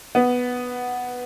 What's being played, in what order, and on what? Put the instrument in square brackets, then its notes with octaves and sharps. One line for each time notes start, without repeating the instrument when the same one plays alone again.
[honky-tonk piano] B3